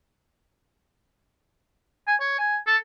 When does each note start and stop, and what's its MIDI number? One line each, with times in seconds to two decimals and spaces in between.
2.08 2.16 80
2.20 2.37 73
2.39 2.57 80
2.67 2.77 69